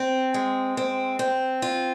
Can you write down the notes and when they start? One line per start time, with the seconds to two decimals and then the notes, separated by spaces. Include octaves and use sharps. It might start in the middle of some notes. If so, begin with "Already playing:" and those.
Already playing: C4
0.34 G#3
0.77 C4
1.19 C4
1.62 F4